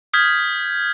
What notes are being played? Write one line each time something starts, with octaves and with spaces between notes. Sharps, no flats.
D#6 F6 G6 G#6 B6